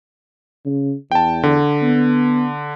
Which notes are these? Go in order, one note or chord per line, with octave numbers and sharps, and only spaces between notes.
C#3
E2 G5 A5
D3
B3